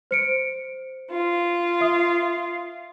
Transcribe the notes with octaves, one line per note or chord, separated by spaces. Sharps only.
C5 C#7 D7
F4
E5 D#6